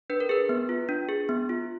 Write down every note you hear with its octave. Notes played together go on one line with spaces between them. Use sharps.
D4 B4
A#4
G#4 B4
B3
F4
D4
G#4
B3
F4